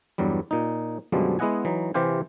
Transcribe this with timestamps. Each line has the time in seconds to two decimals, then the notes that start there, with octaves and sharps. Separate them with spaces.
0.18 E2 G2 F#3 G3
0.51 A#2 D#4
1.12 F#2 B2 D3 F3 G3 G#3
1.39 G#3 B3 E4 D#5 F#5 G#5
1.65 E3 F#3 D#4
1.94 C3 E3 G4 C5 F5 G#5